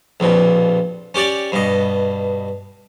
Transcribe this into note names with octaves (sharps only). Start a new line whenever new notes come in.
A#1 F2 B2
C#4 G4 C#5 D5 G5
G2 B2 D#5